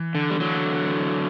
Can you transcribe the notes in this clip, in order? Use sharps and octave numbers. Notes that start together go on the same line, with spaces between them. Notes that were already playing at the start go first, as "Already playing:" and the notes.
Already playing: E3
D3
G3
D3 F#3